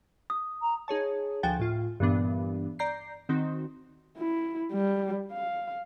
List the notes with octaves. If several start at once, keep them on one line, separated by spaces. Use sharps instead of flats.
D#6
A#5
D#4 G#4 C#5 A5
D2 F3 F#4 G5 G#5 A6
A2 F4
G2 A#2 E3 B3 D4
D5 A#5 G6 C7
D#3 C4 D#4 F#4
E4
G3
F5